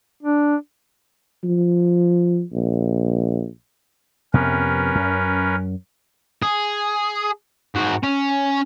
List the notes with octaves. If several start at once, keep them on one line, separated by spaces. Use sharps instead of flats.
D4
F3
A#1
F2 C3 B3 C#4 A#4 B4
F#2
G#4
G#2 F#4
C#4